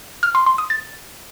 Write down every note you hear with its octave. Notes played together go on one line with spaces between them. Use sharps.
F6
C6
C6
D#6
A6